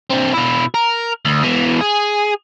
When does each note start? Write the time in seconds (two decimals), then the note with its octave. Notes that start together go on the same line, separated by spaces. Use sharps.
0.11 C4 D4
0.34 B2 E4
0.75 A#4
1.25 D2
1.43 B2 E3
1.81 G#4